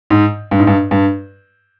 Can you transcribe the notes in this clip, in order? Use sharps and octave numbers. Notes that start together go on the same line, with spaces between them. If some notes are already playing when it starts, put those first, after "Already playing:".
G#2
G2
G#2
G2
G2